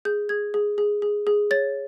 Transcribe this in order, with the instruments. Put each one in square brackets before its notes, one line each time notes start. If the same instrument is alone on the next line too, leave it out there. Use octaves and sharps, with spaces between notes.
[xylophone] G#4 G6
G#4 G#6
G#4
G#4
G#4
G#4
C#5 A6